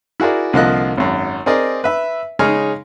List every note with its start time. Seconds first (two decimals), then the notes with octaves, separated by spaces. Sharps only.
0.20 E4 F#4 G#4 A#4 D5
0.53 C2 D3 F3 A#3 D#5 F#6
0.97 G#1 F#2
1.46 C4 G#4 A#4 D5 D#5
1.84 B4 E5
2.39 C#3 G#3 D#4 G#4 C#5 F6